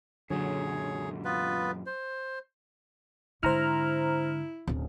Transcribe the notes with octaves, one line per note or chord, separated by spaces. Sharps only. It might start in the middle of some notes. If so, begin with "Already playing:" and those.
F#2 A#2 D3 F#3 G#4 C#5
B3 F4 B4
C5
G#2 D3 E4 C5 A#5 F6
D1 C#4